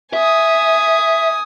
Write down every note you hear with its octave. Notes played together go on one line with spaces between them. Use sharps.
E5 G#5 D#6